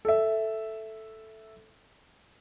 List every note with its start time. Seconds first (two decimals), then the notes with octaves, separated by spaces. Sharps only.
0.05 A4 E5